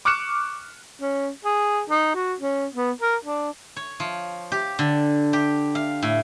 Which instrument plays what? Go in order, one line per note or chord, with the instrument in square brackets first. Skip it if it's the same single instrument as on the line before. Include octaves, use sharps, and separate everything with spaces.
[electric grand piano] C#6 D6 F6 F#6 C#7 E7
[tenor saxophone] C#4
G#4
D#4
F#4
C#4
B3
A#4
D4
[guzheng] C#5
F3
G4
D3
G4
F5
A2